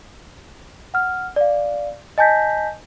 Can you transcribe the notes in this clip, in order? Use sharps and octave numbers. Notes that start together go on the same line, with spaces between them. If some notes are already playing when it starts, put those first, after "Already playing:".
F#5 F6
D5 F5
D#5 G#5 A5 G6 A#6 B6